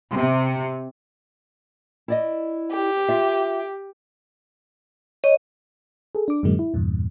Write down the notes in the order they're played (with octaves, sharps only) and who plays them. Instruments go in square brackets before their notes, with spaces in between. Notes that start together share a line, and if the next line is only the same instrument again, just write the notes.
[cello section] C3
[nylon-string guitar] E4 D5 D#5
[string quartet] G4
[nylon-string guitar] F4 E5
[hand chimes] C#5 [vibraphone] D#5
[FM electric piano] G#4 A4
D4 D6
F#2 A2 D3 F#3 G#3 A#3
E4
E2 G2 A#2